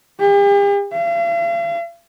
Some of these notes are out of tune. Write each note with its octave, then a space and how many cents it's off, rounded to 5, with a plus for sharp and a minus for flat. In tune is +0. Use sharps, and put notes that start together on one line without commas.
G4 +45
F5 -45